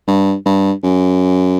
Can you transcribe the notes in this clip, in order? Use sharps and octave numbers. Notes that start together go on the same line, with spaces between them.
G2
G2
F#2